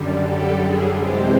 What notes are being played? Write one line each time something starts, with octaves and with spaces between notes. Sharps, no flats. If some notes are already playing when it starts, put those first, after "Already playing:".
Already playing: F#2 D3 G3
G4 A4
G#4
C3 E3 G#3 C4 G4